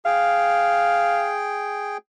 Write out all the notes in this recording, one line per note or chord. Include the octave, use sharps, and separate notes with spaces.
G#4 F5 G5